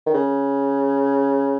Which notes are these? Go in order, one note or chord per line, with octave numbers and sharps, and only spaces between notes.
D#3
C#3